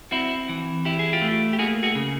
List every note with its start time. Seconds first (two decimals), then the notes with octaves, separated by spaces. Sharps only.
0.11 C4 E4 F#4
0.49 E3
0.85 E4 G4
0.99 G#4
1.13 F4 G4
1.22 A3
1.53 G4
1.59 A#3 F#4 G#4
1.83 F#4 G#4
1.95 C#3